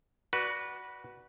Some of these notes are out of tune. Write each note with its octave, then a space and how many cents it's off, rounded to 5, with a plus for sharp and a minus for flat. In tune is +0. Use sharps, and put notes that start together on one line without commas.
F#4 +10 B4 -20 D5 +0